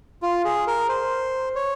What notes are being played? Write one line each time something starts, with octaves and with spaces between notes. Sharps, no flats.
F4
G#4
A#4
C5
C#5